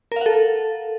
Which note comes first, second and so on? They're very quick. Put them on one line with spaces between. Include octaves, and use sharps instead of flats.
A#4 F5 F#5 A4